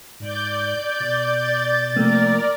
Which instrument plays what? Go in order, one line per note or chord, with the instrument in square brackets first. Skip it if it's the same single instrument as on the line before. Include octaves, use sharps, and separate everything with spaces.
[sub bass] G#2 [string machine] D5 G6
[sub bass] B2 [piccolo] A6
[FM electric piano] C3 A3 A#3 [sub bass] F3 [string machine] A#4 D5